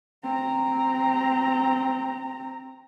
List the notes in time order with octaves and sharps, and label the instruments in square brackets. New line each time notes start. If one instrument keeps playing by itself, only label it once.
[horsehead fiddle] C4 A#5